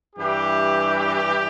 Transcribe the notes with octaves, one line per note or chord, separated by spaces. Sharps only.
G2 E3 G4